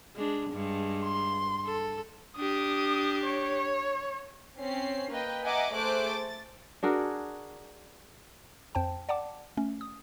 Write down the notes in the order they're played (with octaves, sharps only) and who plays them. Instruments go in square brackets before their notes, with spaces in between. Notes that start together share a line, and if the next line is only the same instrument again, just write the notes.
[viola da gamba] G#3 D4
G2 G#3
[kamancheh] C6
[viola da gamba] A4
[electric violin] D4 G4 [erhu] D#6
[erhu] C#5
[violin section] C4 C#4 C7
A#3 B4 D#5 G5
D#5 E5 F#5 G#5 A#5 D6
A3 G#4 C5 D6 F#6 D7
A6
[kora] D4 F#4 G#4 A#4
[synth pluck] F2 C5 G5 A5
D5 F#5 G5 A5 D6
A3 C#4
D#6